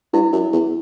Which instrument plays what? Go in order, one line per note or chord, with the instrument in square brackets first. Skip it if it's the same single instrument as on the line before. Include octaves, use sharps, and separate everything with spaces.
[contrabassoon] G2 [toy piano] E4
[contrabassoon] F#2
E2